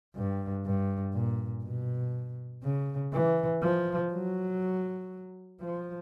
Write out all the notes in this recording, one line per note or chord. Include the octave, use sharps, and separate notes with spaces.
G2
G2
A#2
B2
C#3
E3
F3
F#3
F3